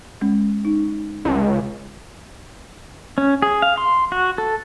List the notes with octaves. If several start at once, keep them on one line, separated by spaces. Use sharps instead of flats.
G#3 C#4
D#4
C#2
C#4
G#4
F5
C6
F#4
A4